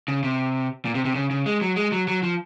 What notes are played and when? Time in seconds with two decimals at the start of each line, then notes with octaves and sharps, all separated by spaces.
0.08 C#3
0.24 C3
0.85 A#2
0.95 C3
1.05 C3
1.15 C#3
1.30 C#3
1.46 G#3
1.61 F#3
1.76 G#3
1.92 F#3
2.08 F#3
2.23 F3